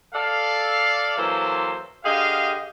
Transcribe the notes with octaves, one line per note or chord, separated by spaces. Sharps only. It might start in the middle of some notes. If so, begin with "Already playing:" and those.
A4 D5 F5
E3 F#3 A#3 A4 C5
D3 G4 G#4 D#5 F5